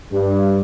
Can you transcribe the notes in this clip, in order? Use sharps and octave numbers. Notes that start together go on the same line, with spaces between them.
G2